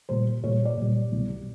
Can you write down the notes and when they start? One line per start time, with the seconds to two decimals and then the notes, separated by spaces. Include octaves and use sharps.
0.09 A#2 G3 C5
0.44 A#2 G3 C#5
0.65 D5
0.77 A#2 G3
1.12 C2 B2 G3